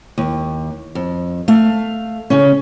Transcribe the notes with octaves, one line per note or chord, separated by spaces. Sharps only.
D#2
F2
A3 F5
C#3 C#4